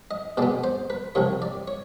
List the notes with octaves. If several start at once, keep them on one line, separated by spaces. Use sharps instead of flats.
D#5
B2 G#3 B3 D5
C5
B4
C2 C3 F3 C#5
D5
C#5